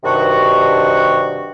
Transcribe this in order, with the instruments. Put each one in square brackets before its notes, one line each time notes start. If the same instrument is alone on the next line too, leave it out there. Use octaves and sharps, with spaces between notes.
[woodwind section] G2 C3 D#3 F#4